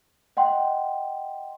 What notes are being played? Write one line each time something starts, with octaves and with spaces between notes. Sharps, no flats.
D#5 F#5 G5 C6